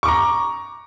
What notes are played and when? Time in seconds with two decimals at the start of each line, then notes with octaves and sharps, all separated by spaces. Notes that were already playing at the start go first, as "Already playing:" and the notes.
0.03 C#6
0.06 D6
0.08 A#5